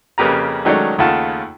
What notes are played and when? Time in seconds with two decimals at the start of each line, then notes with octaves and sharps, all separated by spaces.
0.18 F2 C#3 A#3 G4 B4 A#5
0.65 D#3 F#3 G#3 A3 C#4 D4
0.98 D#2 C#3 A3 F4 F#5 A5